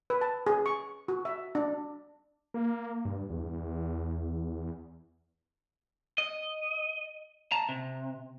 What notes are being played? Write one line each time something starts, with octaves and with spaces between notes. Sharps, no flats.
B4
A5
G#4
C#6
F#4
E5
D4
A#3
G2
E2
D#5
A5 A#5
C3